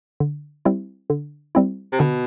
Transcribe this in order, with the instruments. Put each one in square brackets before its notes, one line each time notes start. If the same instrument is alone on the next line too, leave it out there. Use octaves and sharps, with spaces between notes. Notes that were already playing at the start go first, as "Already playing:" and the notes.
[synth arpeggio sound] D3
G3 C4 E4
D3
G3 C4 E4
[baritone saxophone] C3
[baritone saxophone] B2 [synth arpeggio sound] D3